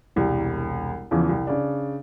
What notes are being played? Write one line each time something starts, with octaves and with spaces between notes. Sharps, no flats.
E1 C2 G4
E2 C#3 E3 F3
C2
C#3 D4